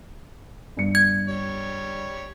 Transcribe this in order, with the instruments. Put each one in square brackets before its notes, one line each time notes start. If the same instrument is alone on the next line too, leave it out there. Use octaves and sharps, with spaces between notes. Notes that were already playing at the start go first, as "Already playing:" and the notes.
[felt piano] G1 G2 C#7
[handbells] G#6
[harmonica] G3 C#5